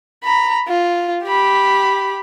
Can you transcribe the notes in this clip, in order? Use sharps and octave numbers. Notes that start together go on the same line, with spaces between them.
A#5 B5
F4
G4 B5